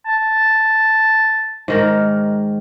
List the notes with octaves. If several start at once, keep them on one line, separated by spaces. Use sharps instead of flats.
A5
G#2 D#3 A#4